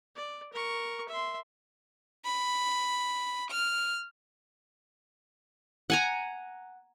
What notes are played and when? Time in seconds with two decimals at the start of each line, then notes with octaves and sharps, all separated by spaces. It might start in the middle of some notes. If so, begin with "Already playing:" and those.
0.16 D5
0.53 A#4 C#6
1.08 E5 C6
2.25 B5
3.51 F6
5.90 F#5 G#5 A#5